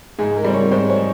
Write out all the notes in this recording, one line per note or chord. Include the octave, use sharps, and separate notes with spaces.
G#2 G#4
A#4
G3 C4
C#5
G#2 C5
C#5